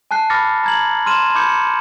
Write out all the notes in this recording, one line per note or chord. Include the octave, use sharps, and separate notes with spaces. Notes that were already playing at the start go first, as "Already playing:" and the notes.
G#5 A5 F#6 C7
B5 D6 F6 A6 A#6 C#7
A#5 G#6 F#7
C6 F6 D#7 E7 F#7
B5 D6 G6 G#6 C#7
C#7